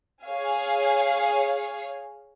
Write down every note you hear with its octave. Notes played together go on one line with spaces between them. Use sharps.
G#4 C#5 F5 G#5